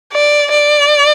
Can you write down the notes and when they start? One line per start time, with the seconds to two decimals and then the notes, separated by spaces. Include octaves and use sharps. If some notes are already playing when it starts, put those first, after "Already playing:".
0.13 D5
0.51 D5